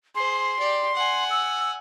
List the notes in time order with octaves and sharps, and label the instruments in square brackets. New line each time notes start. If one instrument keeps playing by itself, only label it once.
[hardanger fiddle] G#4 C5 [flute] C6
[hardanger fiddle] G4 D5
F#5 G#5
[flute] E6